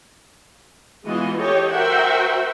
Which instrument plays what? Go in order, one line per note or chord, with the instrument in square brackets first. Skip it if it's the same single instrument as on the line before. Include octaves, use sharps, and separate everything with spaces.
[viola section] E3 G#3 B3 F4 F#4 D#5
G4 A4 C#5 D#5
F#4 A#4 C5 E5 F#5 G5